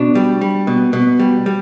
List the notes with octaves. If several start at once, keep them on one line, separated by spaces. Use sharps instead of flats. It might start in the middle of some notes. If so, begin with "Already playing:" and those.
Already playing: B2 D4
G3
G3
B2
B2
G3
G3